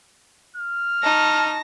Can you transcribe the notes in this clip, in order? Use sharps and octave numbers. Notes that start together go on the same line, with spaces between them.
F6
D#4 A5 C#6 A#6